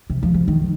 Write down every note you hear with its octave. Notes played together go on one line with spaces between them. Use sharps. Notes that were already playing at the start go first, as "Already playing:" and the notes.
C3
F3
F3
D#3